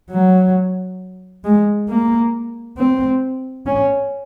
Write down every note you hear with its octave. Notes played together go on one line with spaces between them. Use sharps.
F#3
G#3
A#3
C4
C#4